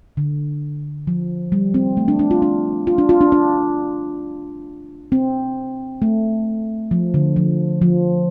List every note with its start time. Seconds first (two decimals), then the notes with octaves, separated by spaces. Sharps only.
0.17 D3
1.07 F3
1.52 G3
1.74 C4
1.97 A3
2.08 D4
2.19 D4
2.31 F4
2.42 D4
2.87 F4
2.98 D4
3.09 F4
3.21 D4
3.32 D4
5.12 C4
6.02 A3
6.91 F3
7.14 D3
7.36 F3
7.82 F3